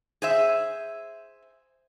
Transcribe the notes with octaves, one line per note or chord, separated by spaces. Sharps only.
G#4 C5 E5